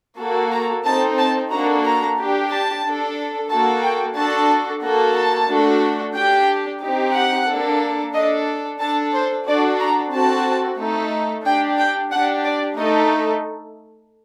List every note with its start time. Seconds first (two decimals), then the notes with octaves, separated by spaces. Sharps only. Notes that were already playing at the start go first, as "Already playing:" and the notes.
0.20 A#3 F#4 A4
0.52 A#5
0.85 C4 D#4 A4 A5
1.19 A5
1.51 A#3 D4 F#4 A4 A#5
1.85 A#5
2.18 D4 G4
2.51 A5
2.84 D4 A4
3.50 A#3 F#4 A4 A5
3.83 G5
4.17 D4 F#4 A4 A5
4.84 A#3 F#4 A4
5.17 A5
5.49 A3 D4 F#4 A4
6.15 D4 G4 G5
6.82 C4 D#4 G4
7.15 F#5
7.48 A#3 D4 A4
8.14 D4 A4 D#5
8.80 D4 A4 A5
9.13 C5
9.47 D4 F#4 A4 D5
9.80 A#5
10.13 C4 F#4 A4 A5
10.79 A3 D#4 A4
11.45 D4 G4 G5
11.79 G5
12.12 D4 G4 F#5
12.45 D5
12.77 A3 D#4 A4 D#5